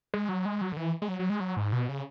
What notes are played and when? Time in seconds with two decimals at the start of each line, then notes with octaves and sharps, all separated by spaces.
0.14 G#3
0.29 F#3
0.45 G#3
0.61 F#3
0.72 D3
0.77 E3
1.02 G#3
1.08 F#3
1.19 F#3
1.30 G#3
1.40 F#3
1.57 G#2
1.73 B2
1.89 C#3